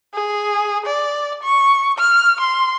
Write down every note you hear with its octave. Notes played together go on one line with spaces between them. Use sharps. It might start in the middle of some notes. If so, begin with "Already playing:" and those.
G#4
D5
C#6
F6
C6